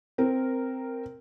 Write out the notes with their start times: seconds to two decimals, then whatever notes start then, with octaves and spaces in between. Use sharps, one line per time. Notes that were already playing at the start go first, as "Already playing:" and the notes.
0.18 C4 A#4